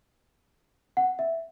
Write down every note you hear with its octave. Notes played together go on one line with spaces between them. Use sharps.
F#5
E5